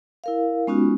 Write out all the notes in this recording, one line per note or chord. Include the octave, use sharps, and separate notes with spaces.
E4 A#4 F5
G#3 B3 C#4 D#4 F4 F#4